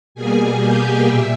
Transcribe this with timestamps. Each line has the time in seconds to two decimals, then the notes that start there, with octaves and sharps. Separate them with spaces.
0.15 B2 G3 A#3 G#4 G#5
0.60 G4 G5
1.06 A#2 E5